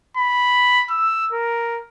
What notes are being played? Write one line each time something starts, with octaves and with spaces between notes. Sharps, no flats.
B5
E6
A#4